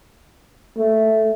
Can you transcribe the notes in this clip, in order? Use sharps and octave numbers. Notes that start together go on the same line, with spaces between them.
A3